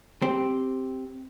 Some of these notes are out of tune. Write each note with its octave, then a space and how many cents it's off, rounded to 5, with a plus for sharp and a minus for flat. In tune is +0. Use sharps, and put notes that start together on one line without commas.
C4 +0 G4 +0